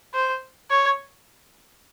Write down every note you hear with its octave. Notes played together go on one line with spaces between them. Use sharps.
C5
C#5